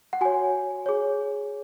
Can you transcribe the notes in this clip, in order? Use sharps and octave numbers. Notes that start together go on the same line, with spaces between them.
F#5
F#4 C#5 G#5
G#4 C#5